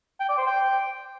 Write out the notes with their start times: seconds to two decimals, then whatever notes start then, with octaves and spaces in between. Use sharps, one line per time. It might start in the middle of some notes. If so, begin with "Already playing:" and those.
0.20 G5
0.29 D5
0.38 C5
0.47 G5